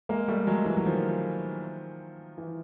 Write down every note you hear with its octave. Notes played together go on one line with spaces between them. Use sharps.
G#3 A#3
G3 A3
F#3 G#3
E3 F#3
F#3
D#3 F3
E3